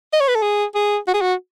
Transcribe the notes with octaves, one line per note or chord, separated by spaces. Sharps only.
D#5
C#5
B4
A4
G#4
G#4
F#4
G#4
F#4